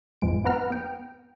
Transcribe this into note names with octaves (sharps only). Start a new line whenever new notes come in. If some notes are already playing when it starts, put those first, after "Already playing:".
A1 F2 F3 G#3 D7
B3 C4 B4 F#5 A#5 F6
B3 G5